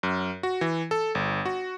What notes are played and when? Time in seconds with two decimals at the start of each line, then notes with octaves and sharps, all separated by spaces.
0.03 F#2
0.43 F#4
0.61 E3
0.91 A4
1.15 G1
1.46 F#4